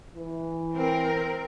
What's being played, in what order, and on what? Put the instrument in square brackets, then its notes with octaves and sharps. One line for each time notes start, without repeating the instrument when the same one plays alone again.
[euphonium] E3
[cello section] C4 A#4